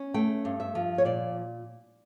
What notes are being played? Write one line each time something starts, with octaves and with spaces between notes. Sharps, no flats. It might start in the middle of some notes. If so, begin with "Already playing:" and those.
Already playing: C#4
A3 G5
G2
E5
F3
C#5
A#2 D5